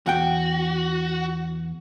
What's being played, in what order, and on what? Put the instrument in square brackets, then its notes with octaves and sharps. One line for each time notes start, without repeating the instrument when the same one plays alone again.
[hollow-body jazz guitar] E2 F#5 G5 [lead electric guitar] F#4